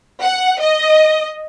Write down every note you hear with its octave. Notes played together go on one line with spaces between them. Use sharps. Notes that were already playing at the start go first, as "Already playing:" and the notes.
F#5
D#5